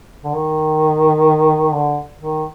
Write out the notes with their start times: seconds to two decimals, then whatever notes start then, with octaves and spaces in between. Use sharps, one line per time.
0.24 D3
0.34 D#3
1.73 D3
2.19 D#3